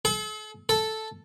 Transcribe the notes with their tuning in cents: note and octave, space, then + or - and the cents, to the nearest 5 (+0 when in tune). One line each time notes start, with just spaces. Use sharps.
A4 -45
A4 -5